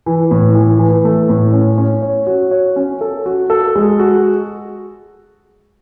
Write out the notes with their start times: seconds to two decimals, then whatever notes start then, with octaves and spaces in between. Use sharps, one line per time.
0.06 E3
0.31 A2
0.55 E3
0.79 E3
1.05 A3
1.29 A2
1.53 C#4
1.78 C#4
2.02 C#5
2.27 F#4
2.51 C#5
2.76 C#4
3.01 A4
3.26 F#4
3.50 A4
3.76 G#3
4.00 F#4